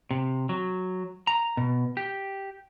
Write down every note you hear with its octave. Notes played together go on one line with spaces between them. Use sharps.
C3
F#3
A#5
B2
G4